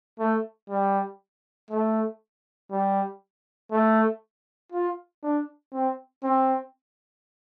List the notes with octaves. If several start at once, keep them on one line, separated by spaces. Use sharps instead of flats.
A3
G3
A3
G3
A3
F4
D4
C4
C4